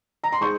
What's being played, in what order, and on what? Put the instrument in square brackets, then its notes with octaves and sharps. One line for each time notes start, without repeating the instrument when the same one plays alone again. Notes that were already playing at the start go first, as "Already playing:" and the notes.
[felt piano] A#5
C6
[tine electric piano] G#3 D#4 G#4 C5 [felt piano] C#6